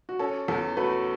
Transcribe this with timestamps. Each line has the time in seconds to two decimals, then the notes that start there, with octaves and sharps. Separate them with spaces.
0.09 F#4
0.19 C#4 A4
0.48 E2 A4
0.77 A3 F#4 B4